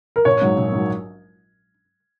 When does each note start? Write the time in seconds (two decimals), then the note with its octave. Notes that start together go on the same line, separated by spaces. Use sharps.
0.16 A#4
0.25 A#1 C#5
0.41 G#2 F#3
0.57 A#1
0.72 G#2 F#3